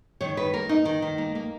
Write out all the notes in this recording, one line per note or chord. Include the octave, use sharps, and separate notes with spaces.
D#3 C#5
D#3 B4
A#3 A#4
A#3 D#4
D#3
D#3
A#3
A#3